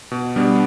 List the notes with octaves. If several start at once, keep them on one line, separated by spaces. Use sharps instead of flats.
B2
G3 B3 D4